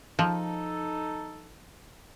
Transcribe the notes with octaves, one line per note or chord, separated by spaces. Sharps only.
F3 D#4 A4